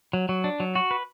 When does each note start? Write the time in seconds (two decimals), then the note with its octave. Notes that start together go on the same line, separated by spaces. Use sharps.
0.13 F#3
0.29 F#3
0.44 D4
0.60 F#3
0.75 F#4
0.91 B4